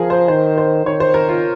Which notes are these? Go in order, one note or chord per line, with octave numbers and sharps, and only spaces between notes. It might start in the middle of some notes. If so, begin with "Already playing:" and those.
Already playing: F3 G#4 A#4
C5
D#3 C5
C5
D#3 C#5
C5
A#4
F4